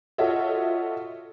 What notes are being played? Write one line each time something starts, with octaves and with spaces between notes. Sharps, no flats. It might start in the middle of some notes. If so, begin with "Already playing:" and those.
F4 F#4 A4 C#5 D#5 E5